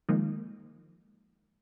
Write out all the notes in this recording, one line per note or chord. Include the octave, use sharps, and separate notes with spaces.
D#3 F3 G#3 A#3 D#4